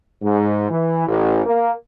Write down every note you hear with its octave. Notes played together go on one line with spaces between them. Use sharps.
G#2
E3
A1
A#3